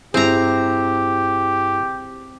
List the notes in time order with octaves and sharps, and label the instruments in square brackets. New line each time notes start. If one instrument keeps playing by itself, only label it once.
[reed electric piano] G2 E4 G#4 [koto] C4 A#5 [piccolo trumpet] G4